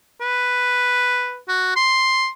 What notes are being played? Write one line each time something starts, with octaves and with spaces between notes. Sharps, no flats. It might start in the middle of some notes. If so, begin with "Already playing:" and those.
B4
F#4
C6